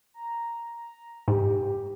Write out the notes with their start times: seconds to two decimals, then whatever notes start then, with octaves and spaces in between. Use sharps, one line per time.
0.14 A#5
1.28 G#2 G4